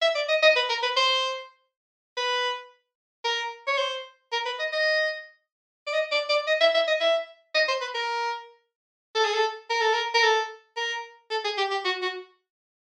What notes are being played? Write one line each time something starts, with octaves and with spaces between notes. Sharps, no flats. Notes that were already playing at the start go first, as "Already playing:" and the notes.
E5
D5
D#5
D#5
B4
A#4
B4
C5
B4
A#4
C#5
C5
A#4
B4
D#5
D#5
D5
D#5
D5
D5
D#5
E5
E5
D#5
E5
D#5
C5
B4
A#4
A4
G#4
A4
A#4
A4
A#4
A#4
A4
A#4
A4
G#4
G4
G4
F#4
F#4